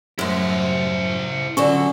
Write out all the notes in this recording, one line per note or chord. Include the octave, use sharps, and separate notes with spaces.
F#2 A2 E4 C5
D3 F#3 C#4 F4 A4 D5 C#6